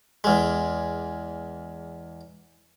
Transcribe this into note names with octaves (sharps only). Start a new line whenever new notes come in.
E2 G#3